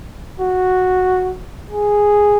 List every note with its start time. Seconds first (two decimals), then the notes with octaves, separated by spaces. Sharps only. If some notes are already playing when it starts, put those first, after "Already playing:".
0.40 F#4
1.71 G#4